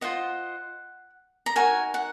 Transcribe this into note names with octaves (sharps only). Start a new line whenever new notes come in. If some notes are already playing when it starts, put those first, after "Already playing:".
F4 C5 D#5 F#5
A#5
D#4 F#4 A#4 G#5
F#5